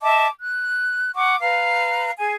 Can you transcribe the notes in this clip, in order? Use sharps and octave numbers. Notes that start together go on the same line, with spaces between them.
D#5 E5 A5 D6
F#6
F#5 C#6 D6
B4 F5 A#5
G#4 G#5